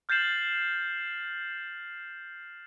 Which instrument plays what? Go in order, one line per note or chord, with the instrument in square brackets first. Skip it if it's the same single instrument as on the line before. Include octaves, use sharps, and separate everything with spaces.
[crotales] F6 G6 A6 C7 E7 F#7